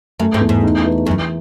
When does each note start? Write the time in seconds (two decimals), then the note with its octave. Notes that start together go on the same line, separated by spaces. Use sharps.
0.20 F#2 A3
0.34 G#2
0.41 E2
0.49 G#2
0.63 D#4
0.85 E3
1.06 F#2 E3